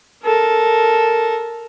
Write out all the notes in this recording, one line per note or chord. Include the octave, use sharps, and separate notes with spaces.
A4 A#4